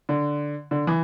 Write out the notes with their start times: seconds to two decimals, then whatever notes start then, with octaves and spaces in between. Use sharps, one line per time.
0.09 D3
0.71 D3
0.87 E3